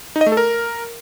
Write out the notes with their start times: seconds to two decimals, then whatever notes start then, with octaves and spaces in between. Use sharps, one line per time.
0.16 D#4
0.21 D#5
0.26 A3
0.32 A4
0.37 A#4